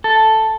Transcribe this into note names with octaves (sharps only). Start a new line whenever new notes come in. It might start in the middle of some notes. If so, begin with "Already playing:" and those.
A4